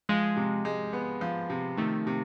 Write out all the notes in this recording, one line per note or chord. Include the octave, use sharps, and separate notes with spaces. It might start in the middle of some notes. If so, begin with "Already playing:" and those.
F3 G#3
C3
G#3
B3
F3
C3
D#3 A3
C3